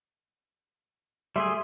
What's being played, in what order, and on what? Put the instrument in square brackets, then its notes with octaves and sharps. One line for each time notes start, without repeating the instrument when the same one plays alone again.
[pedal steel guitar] G3 A3 G#4 [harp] E5 [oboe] C6